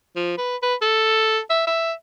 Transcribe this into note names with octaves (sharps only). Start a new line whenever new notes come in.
F3
B4
B4
A4
E5
E5